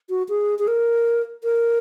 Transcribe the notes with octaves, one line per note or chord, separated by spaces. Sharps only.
F#4
G#4
G#4
A#4
A#4